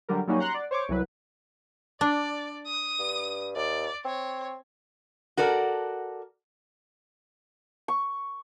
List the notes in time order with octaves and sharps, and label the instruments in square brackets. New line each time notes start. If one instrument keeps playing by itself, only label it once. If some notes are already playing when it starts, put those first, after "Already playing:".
[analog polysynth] D3 F#3 G3 A#4
F#3 G3 A#3 C#4 D#4 F#4
F#5 A#5 C6 F#6
D5
C5 C#5 C#6 D6
C2 E3 F#3 B4
[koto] D4 [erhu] D5
[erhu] D#6
[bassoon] G2
[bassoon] D#2 [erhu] D5
[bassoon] C4 [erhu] C#5
[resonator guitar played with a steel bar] F#4 A4 A#4 D5
[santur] C#6